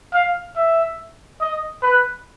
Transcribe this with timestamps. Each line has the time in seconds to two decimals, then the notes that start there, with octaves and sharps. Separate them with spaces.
0.14 F5
0.56 E5
1.41 D#5
1.83 B4